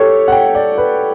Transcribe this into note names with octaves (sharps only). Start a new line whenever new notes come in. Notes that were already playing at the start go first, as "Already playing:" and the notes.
Already playing: G4 A4 C#5
F#5
G5
D5
B4